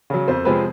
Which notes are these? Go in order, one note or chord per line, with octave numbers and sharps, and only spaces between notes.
C#3 F#3
F2 C5
C3 F3 G#3 C4 B4